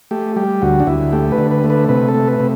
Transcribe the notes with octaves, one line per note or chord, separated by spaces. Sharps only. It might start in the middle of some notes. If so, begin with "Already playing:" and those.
A3 G4
G3 G4
D2 F#4
D4
D2 E4
A3 G4
B4
D3
B4
A3
B4
C3 B4
A4
A3
B4
C3